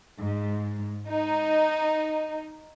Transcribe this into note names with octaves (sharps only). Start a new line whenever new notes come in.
G#2
D#4